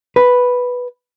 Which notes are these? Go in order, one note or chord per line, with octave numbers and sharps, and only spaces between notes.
B4